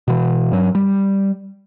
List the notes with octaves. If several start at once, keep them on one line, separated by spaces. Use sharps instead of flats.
B2 E3
G2 F#3
G3